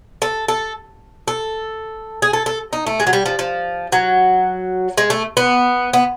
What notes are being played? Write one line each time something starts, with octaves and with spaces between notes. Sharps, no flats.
A4
A4
A4
G#4
A4
A4
D#4
A3
G#3
F#3
G3
F3
F3
F#3
G#3
A3
B3
B3